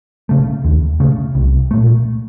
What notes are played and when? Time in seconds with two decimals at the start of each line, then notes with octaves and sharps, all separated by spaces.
0.29 C#3 A3
0.64 D#2
1.00 C#3 A3
1.35 C2
1.71 A#2 A3